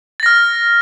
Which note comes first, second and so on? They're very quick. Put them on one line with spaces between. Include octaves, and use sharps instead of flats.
A6 A#6 F6